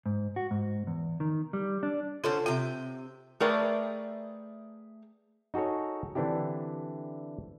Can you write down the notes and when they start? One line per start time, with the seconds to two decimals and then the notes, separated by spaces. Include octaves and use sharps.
0.06 G#2
0.36 F#4
0.51 G#2
0.87 E2
1.20 D#3
1.53 G3
1.83 D4
2.24 D3 C#4 F4 A4 C5
2.46 C3 F4 G5
3.40 A3 G#4 A#4 B4 D5 G5
5.54 D#4 F#4 G#4 A4 C#5
6.15 D3 E3 C4 D4 E4 G4